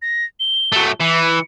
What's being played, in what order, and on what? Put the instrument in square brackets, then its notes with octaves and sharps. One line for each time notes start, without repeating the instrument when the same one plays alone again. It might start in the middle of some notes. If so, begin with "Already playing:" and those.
[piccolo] A#6
G7
[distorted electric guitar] F#3 A3
[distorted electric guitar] E3 [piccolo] C#7